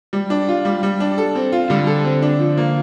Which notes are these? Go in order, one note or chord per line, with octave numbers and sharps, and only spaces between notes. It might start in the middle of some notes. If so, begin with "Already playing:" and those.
G3
D4
F4
G3
G3
D4
A4
C4
F4
D3 G3
A4
C4
D4
F3
A#3